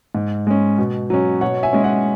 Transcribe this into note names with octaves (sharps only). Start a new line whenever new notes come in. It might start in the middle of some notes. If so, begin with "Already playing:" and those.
G#2
G#3 C#4
B2
F#3 C#4
B2 C#5 F#5
E5 G#5
G#3 C#4
C#5 F#5